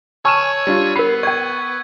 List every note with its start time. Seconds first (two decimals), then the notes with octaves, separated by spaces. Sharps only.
0.25 C#5 G#5 A5 C#6 E6 F6 D#7 E7
0.67 G3 D4 F4
0.96 B3 A#4 B5 C7
1.23 D5 G5 C#6 G#6